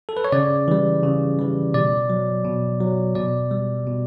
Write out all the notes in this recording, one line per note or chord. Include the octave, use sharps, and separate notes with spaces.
A4
B4
C#5
C#3 D5
E3 G3
C#3
E3 G3
B2 D5
F#3
B2
F#3
B2 D5
G3
B2